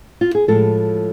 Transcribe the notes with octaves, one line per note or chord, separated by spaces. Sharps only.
F4
G#4
A2 F3 G#3 A4